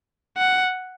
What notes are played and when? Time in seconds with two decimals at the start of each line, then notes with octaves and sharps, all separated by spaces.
0.37 F#5